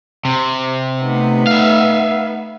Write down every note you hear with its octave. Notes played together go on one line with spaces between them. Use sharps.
C3
A3 B3 D#4
E5 F5